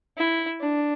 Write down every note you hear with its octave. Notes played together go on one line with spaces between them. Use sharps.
E4
D4